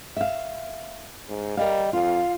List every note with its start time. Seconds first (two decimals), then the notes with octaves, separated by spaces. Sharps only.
0.17 E5 F5
1.29 G#2
1.57 G3 A#4 D#5 F5
1.93 F2 F4 F5